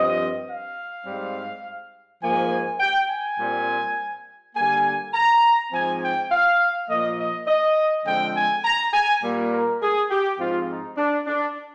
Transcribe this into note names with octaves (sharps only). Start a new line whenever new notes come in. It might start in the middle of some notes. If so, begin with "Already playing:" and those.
Already playing: G2 F3 C4 D#5
F5
G#2 G3 C4
G#2 F3 A#3 G#5
G5
G#5
A#2 G3 C4
D3 G3 A#3 G#5
A#5
G#2 F3 C4 G#5
G5
F5
A#2 F3 A#3 D#5
D#5
D#5
D3 F3 G#3 C4 G5
G#5
A#5
G#5
A#2 G3 A#3
A#4
G#4
G4
G#2 F3 C4 F4
D#4
D4
D4